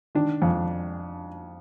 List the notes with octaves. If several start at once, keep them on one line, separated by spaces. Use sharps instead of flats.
D#3 D4
F2